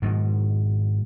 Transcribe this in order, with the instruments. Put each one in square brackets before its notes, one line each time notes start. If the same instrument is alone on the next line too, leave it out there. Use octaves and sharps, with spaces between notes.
[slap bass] G#2 B2 D#3